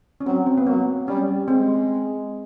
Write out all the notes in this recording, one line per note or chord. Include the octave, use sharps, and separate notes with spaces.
C#4
F#3 C4
C4
B3
F#3 A#3
G3 C#4
G#3 C4